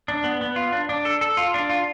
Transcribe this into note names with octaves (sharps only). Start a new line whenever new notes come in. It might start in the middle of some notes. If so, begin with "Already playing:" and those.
D4
B3
B3
F4
D4
D4
A4
A4
F4
D4
F4